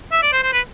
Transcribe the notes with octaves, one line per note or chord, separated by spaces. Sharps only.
E5
D5
C5
C5
B4